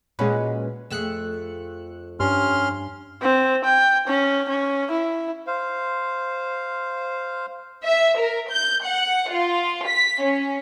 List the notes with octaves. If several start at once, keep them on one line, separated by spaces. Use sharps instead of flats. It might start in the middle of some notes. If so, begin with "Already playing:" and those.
A#2 G#3 C#4 F#4 B4
F2 A3 G#4 E6 F#6 C#7
G2 C#4 C6 F6
C4
G5
C#4
C#4
E4
C5 F5
E5
A#4
G6
F#5
F4
B6
C#4